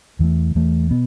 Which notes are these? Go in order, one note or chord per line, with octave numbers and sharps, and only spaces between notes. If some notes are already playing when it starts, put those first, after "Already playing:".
E2 E3 A3
E2 E3 A3
B2 B3